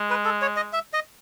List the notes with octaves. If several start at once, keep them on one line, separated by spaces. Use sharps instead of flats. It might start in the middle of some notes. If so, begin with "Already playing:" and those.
Already playing: G#3
B4
A4
C#5
D#5
E5
D#5